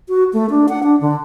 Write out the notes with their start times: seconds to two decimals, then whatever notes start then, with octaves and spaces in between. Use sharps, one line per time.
0.09 F#4
0.33 A3
0.50 D4
0.69 F#5
0.83 D4
1.01 D3